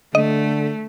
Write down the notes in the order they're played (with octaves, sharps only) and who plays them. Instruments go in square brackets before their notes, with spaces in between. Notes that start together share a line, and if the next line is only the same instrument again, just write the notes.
[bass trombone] D3 [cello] A3 [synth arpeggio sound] D#5